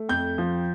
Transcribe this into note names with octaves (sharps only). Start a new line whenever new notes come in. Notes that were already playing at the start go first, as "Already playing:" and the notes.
Already playing: A3
F2 G6
F3